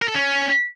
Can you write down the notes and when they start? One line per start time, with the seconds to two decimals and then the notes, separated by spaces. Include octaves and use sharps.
0.02 A#4
0.08 A4
0.15 C#4